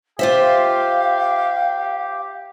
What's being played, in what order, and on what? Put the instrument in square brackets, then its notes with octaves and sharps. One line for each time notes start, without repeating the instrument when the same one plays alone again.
[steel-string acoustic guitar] F4 C5 E5 [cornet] G4 [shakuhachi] F5